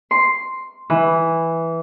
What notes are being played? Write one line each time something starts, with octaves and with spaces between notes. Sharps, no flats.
C6
E3